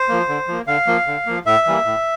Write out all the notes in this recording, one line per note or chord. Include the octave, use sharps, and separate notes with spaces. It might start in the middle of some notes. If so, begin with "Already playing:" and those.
Already playing: C5
F3 A#3
D3
F3 A#3
D3 F5
F3 A#3
D3
F3 A#3
A2 E5
E3 G3 A#3
A2